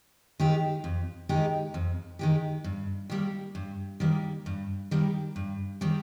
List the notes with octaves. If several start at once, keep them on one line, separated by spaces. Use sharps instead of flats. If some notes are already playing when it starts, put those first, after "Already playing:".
D#3 G#3 D#4 G4
F2
D#3 G#3 D#4 G4
F2
D#3 G#3 D#4 G4
G2
D#3 G3 A#3
G2
D#3 G3 A#3
G2
D#3 G3 A#3
G2
D#3 G3 A#3